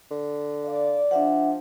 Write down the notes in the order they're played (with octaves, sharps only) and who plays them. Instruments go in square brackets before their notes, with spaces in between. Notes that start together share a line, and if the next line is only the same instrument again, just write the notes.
[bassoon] D3
[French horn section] D5 [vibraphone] F5
[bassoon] F3 [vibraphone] D4 E5 F#5